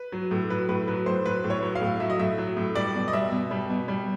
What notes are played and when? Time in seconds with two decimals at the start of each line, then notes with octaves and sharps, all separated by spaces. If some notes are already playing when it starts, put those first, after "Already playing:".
Already playing: B4
0.12 F#3
0.31 A2
0.50 F#3 B4
0.69 A2 B4
0.87 F#3 B4
1.06 A2 C5
1.25 F#3 B4
1.44 A2
1.50 C#5
1.63 F#3
1.75 F5
1.81 A2
2.00 F#3 E5
2.10 D#5
2.19 A2 E5
2.38 F#3
2.57 A2
2.75 G3 D5
2.95 B2
3.08 D#5
3.13 G3 E5
3.32 B2
3.51 G3
3.70 B2
3.88 G3